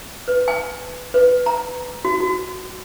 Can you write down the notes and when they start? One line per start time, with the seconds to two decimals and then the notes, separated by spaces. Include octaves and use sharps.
0.28 B4
0.48 G#5
1.14 B4
1.46 A#5
2.05 F#4
2.20 F#4